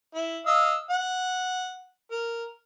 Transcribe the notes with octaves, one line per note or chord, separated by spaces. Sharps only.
E4
D#5 F5 E6
F#5
A#4